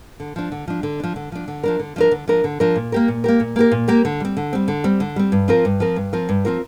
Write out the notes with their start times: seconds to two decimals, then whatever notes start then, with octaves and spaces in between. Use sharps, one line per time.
0.20 D3
0.36 F3 D4
0.52 D3
0.68 F3 D4
0.83 D3
1.00 F3 D4
1.16 D3
1.32 F3 D4
1.48 D3
1.63 F3 D4 A#4
1.80 D3
1.96 F3 D4 A#4
2.11 D3
2.28 F3 D4 A#4
2.44 D3
2.60 F3 D4 A#4
2.76 A#2
2.92 A#3 G4 A#4
3.08 A#2
3.24 A#3 G4 A#4
3.40 A#2
3.56 A#3 G4 A#4
3.71 A#2
3.88 A#3 G4 A#4
4.05 D3
4.20 G3 C4
4.37 D3
4.53 G3 C4
4.68 D3
4.84 G3 C4
5.00 D3
5.16 G3 C4
5.32 G2
5.48 F3 C4 F4 A#4
5.65 G2
5.80 F3 C4 F4 A#4
5.96 G2
6.13 F3 C4 F4 A#4
6.29 G2
6.45 F3 C4 F4 A#4